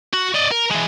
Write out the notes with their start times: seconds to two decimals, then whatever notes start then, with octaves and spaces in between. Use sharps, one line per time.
0.14 F#4
0.35 D5 D#5
0.52 A#4
0.71 E3 G#3